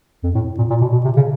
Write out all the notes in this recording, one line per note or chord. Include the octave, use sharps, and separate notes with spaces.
F2
A2
A#2
A#2
B2
B2
C3
C#3